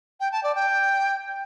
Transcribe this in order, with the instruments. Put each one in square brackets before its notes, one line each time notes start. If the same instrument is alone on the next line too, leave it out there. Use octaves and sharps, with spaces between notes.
[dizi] G5
A5
D5
G5